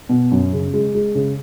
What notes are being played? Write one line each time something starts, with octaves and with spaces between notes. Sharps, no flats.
B2
F#2
C#3
G#3
G#3
C#3